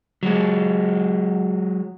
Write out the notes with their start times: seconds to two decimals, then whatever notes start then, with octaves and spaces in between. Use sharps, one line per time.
0.23 F#3 G#3